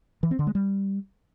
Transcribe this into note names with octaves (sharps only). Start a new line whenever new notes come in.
E3
C4
D3
G#3
G3